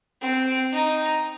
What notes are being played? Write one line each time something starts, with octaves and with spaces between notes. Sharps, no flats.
C4
D#4